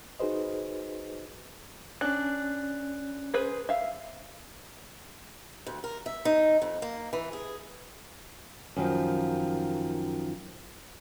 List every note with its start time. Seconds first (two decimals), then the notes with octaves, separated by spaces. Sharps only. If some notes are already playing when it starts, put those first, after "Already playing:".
0.19 D#4 F#4 G#4 B4 C5 D#5
2.01 C#4 D4 F#6
3.34 G#4 B4 C5
3.69 E5 F5
5.67 D2
5.84 A#4
6.06 E5
6.25 D#4
6.62 F2
6.82 A#3
7.13 E3
7.33 G#4
8.76 F#2 D#3 F3